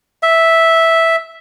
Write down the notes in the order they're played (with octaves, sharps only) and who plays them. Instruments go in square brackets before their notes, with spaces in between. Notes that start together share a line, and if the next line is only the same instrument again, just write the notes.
[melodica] E5